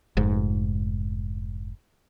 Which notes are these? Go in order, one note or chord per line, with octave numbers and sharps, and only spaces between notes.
F1 G#2